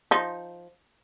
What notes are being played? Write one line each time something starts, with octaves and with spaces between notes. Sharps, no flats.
F3 D#4